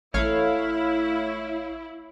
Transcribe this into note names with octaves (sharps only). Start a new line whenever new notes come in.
A1 A3 E4 A4 C#5 F5 A#5